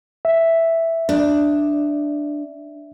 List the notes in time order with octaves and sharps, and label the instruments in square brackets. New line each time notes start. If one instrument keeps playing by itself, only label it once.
[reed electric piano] E5
[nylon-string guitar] D4